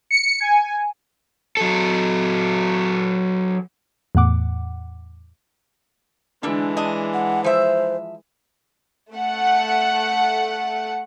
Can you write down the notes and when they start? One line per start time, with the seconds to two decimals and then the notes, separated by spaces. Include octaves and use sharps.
0.11 C#7
0.40 G#5
1.57 F#3 A4
4.15 E2 A2 F#5 D6
6.43 D3 E3 G#3 D4
6.77 D4 D#5
7.14 F#5
7.44 F3 C5 E5
9.13 A3 F#5